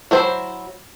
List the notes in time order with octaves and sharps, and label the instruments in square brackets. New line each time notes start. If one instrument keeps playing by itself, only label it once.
[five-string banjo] F#3 E4 C5